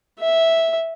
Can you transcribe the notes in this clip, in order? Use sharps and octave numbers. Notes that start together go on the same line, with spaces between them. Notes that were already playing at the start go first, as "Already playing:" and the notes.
E5